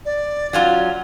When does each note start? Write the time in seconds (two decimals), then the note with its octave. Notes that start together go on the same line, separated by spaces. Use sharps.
0.05 D5
0.53 F#3 C#4 F4